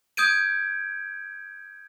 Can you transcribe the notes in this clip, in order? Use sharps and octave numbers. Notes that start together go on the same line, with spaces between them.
D#6 G6 G#6 D7 D#7